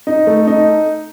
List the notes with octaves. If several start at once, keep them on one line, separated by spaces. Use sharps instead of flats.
D#4
A3
D#4